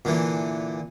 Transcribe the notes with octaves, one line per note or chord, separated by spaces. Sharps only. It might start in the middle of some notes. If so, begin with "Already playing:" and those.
A#2 D3 E3